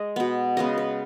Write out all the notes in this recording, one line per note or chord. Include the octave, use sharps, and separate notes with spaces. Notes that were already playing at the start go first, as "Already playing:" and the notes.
Already playing: G#3 D#5
B2 B3
C#3 G#3 B3 D#5
B4